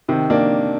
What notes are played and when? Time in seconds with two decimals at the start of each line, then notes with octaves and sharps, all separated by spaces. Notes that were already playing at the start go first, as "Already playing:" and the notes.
0.08 C3 D#3
0.30 A#3 D4